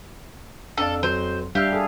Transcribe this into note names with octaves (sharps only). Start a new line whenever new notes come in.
F2 D4 A4 D5 F5
F#3 C5
G3 D4 G4 E5 F5 E6 F6
G#4 A4